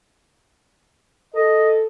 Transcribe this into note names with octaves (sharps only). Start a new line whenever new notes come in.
A4 D#5